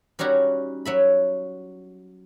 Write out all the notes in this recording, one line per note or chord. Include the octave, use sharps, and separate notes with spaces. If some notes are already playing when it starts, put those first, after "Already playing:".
G3 C#4 D#4 F#4 G4
F#3 E5 B5